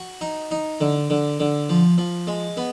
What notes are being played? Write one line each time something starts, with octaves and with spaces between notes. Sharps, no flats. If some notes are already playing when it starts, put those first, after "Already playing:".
Already playing: F#4
D#4
D#4
D3
D3
D3
F3
F3
G#3
B3